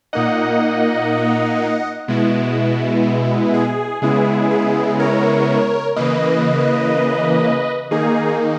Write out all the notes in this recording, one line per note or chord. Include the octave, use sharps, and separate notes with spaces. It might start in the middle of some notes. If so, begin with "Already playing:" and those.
A#2 A#3 D#4 D#5 F#5
B2 G#3 B3 E4
G#4
C#3 G#3 B3 E4 G#4
G#4
A#4 C#5
C#3 E3 A#3 B4 D#5
D#3 A#3 D#4 G#4